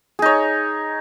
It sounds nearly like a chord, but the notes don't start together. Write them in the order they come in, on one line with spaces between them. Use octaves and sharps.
G#4 D#4 C#5